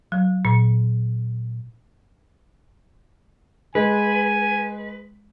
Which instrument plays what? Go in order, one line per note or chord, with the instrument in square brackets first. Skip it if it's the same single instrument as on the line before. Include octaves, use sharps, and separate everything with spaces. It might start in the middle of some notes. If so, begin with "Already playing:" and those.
[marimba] F#3
A#2
[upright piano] G#3 [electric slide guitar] B4 [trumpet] G#5